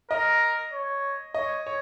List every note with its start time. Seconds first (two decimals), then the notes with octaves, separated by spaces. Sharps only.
0.11 A#4 D#5
0.73 C#5
1.34 C#5 D#5
1.67 C#5